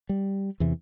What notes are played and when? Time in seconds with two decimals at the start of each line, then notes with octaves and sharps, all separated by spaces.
0.09 G3
0.60 E2 C3 E3